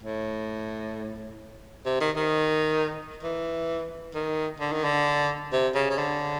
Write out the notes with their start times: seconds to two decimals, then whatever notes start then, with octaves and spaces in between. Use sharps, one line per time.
0.03 A2
1.86 C3
2.01 D#3
2.16 D#3
3.23 E3
4.15 D#3
4.60 D3
4.72 D#3
4.84 D3
5.52 C3
5.75 C#3
5.90 C#3
5.98 D3